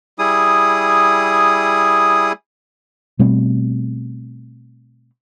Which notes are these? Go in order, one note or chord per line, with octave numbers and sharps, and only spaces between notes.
G3 E4 G#4 D#6
B2 G3 A3 C4